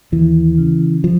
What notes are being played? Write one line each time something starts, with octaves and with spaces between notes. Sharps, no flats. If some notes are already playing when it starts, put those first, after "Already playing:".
D#2 E3
C#3
F3